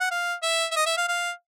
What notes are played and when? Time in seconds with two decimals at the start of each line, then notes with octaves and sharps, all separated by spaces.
0.01 F#5
0.11 F5
0.43 E5
0.72 E5
0.76 D#5
0.86 E5
0.97 F5
1.09 F5